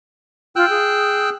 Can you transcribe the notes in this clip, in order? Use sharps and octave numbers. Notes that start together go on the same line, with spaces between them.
F4 G5 E6 F#6
G#4